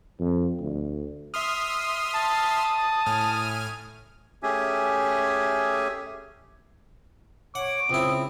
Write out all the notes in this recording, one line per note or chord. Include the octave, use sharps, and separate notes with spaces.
F2
D2
E5 C6 D#6 F6
A5
A2 G#5 F6
A3 C#4 G4 G#4 E5 G#5
C#5 F#5 D6
C#2 C4 E4 D#6